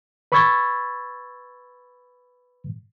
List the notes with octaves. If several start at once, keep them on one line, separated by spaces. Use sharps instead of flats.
B4 B5 C#6 E6 G#6 A6